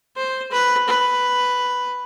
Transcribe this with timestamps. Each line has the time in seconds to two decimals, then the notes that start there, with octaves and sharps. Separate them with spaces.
0.16 C5
0.51 B4
0.88 B4